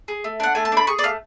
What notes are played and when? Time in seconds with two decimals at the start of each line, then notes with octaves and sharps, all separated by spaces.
0.08 G#4
0.24 A3
0.40 D4 F#5
0.55 A3 G#5
0.65 A5
0.72 D4 B5
0.87 G#4 C#6
0.99 D5
1.03 A3 F5